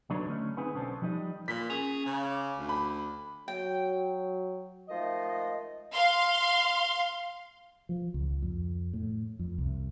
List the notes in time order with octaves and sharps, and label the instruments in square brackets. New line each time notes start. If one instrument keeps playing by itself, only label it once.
[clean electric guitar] D3 F#3 D4 D#4 B4 C#5
D3 A3 C#4
B3 C4 D#4 G#4 B4 G#5
B1 D3 B3 C#4 C5 A5
F3 G3 D#4 D#5
[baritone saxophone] A#2 [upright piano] B6
[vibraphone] C#4 [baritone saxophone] G#4
[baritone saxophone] C#3
[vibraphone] D6
[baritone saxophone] D2
[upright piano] B5
[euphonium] F#3 [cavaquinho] G5
[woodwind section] D#3 F3 G#3 A3 D#5
[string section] F5 C6
[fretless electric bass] F3
C#2
F2
A2
F2
C2